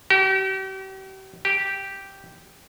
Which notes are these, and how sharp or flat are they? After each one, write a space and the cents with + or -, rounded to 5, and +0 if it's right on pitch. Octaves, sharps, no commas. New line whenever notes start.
G4 -40
G4 -5